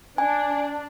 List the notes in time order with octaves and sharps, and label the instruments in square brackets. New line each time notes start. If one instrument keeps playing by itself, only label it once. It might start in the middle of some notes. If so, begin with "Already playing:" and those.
[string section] D4 [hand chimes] G#5